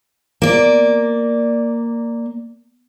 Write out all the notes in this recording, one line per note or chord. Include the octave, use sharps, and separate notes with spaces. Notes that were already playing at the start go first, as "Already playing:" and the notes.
A#3 D5